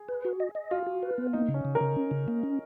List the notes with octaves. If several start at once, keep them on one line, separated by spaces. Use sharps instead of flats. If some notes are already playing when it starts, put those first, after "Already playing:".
Already playing: G#4
B4
F#4
D#5
D#5
F4 F#4
F#4
B4
B3
A#3 D#4
C#3
C#4
C#3
A#4
C#3
C#4
C#3
A#3
C#4